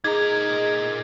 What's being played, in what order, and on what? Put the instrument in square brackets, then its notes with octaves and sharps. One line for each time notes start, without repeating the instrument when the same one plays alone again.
[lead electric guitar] A#2 A#4 [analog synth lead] D#4 [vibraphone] G#4 [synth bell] G#6